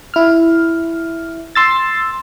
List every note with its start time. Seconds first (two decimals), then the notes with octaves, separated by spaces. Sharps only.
0.14 E4 F6
1.55 C6 E6 A6